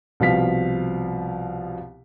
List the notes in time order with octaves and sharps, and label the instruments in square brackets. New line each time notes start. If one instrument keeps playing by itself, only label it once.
[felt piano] C2 B2 F3 F5 B6